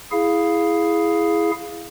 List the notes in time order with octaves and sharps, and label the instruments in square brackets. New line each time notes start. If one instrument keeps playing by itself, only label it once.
[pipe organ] E4 G#4 F5